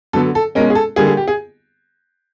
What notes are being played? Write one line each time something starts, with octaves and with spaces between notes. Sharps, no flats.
D3 F#3 B3 A4
A4
B2 G#3 C#4 A#4
G#4
A4
D3 G3 A#3 G#4
G#4
G4
G#4